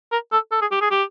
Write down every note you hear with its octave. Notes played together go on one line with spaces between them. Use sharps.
A#4
A4
A4
G#4
G4
G#4
G4